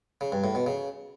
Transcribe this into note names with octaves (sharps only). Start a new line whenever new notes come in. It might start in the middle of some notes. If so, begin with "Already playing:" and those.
C#3
G2
A2
B2
C#3